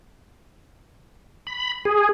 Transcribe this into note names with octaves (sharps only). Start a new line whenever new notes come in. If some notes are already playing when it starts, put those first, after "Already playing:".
B5
G#4